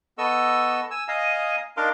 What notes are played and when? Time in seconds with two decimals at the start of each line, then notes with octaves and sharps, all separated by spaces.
0.18 B3 A4 D#5 C#6 E6
0.91 G#5 E6
1.08 D#5 F5 G#5 A#5 D#6
1.77 D4 D#4 A#4 F5 C6 D6